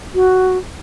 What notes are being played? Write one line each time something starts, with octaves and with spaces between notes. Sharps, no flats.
F#4